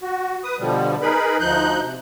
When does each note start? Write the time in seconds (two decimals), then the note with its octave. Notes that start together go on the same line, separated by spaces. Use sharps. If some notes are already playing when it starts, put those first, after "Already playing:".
0.02 F#4
0.43 B4 D#6
0.59 B2 D3 F3 G3
1.02 D#4 G#4 A#4 B4 B5
1.40 D2 F3 D#4 F#6 G6
1.82 C3